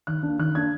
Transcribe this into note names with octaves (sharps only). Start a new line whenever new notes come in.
D#3 F#6
A#3 D4
D#3 F#6
A#3 D4 G#6